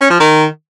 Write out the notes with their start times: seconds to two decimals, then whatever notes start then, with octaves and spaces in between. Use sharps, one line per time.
0.01 C#4
0.10 F3
0.20 D#3